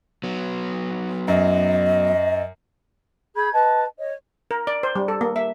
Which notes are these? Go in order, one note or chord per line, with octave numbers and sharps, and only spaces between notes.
F#3 B3
F#2 D#5
G#4 B5 G6 G#6
B4 D#5 A5
C#5 D#5
A#4
D5
C5
G3
A4
A#3
E5